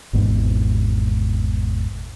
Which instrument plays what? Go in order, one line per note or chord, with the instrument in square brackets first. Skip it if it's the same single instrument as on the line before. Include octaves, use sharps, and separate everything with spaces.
[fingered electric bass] G#1 E2 G#2 B2